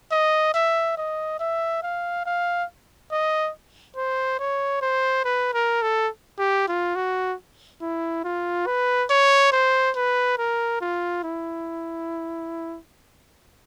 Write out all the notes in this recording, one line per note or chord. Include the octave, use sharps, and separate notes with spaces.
D#5
E5
D#5
E5
F5
F5
D#5
C5
C#5
C5
B4
A#4
A4
G4
F4
F#4
E4
F4
B4
C#5
C5
B4
A#4
F4
E4